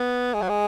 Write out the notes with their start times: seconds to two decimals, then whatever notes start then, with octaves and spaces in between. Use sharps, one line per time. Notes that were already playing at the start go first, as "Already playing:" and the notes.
Already playing: B3
0.34 G#3
0.42 F#3
0.49 G#3